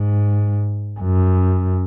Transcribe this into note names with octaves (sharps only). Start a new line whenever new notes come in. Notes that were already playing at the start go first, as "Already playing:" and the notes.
Already playing: G#2
F#2